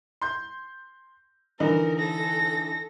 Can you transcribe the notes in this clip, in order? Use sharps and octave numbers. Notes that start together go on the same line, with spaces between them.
C6 G6
D3 E3 D#4 A#4
A4 A#6